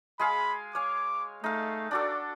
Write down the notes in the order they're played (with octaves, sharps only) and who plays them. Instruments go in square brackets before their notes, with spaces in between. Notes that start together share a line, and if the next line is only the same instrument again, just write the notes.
[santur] G#3 G#4 F5 [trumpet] B5
[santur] C#5 F5 G#5 [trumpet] D6
[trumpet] A3 [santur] D#4 F5
[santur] D4 F#4 A4 [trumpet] D5